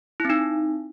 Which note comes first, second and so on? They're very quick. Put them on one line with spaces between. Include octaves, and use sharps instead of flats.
E4 C4 D#4